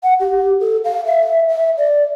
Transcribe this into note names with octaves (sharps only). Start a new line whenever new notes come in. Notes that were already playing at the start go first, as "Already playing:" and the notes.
F#5
G4
A4
F5
E5
E5
D5